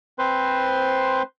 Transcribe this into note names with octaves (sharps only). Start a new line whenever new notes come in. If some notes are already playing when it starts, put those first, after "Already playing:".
C4 B4 C5 C6